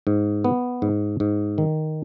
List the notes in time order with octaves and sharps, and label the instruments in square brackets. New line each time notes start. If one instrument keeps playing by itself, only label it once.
[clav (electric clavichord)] G#2
B3
G#2
G#2
D#3